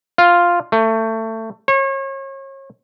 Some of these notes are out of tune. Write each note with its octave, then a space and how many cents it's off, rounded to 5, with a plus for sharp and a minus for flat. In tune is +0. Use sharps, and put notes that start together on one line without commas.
F4 +0
A3 +20
C#5 -35